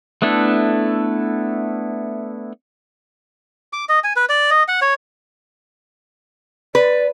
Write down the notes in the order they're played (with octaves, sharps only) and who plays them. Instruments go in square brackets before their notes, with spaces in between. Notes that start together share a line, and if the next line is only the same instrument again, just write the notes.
[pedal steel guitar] A3 B3 D4 E4 A4
[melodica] D6
D#5
G#5
B4
D5
D#5
F#5
C#5
[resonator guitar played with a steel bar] B4 [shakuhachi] D5